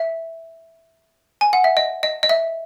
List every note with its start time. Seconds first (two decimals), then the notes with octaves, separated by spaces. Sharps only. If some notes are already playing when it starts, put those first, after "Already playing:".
Already playing: E5
1.41 G#5
1.53 F#5
1.64 E5
1.77 D#5
2.03 D#5
2.23 D#5
2.29 E5